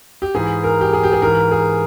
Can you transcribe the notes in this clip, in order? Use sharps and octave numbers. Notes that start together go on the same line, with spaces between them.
G4
G#2 E3 G#4
A#4
G4
G#4
G4
G#4
G#2 E3 A#4
G#4